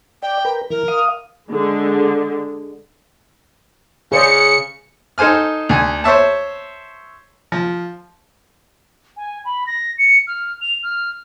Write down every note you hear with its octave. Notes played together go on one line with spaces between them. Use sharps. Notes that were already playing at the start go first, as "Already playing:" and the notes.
D5 G5
A#4 B4
E3 A#4
F5 D#6
D3 G#3
C#3 G#4 C5 D5 C#7
D#4 A4 C5 G#5 F6
D2 G#5
C5 C#5 E5 A5
F3
G#5
B5
A#6
C#7
F6
F7
F6